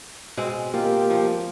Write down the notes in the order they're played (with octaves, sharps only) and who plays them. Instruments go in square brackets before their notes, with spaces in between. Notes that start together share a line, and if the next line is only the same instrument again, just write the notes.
[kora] B2 G#3 C4
[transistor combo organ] A#3 G4 [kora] F4
[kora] F3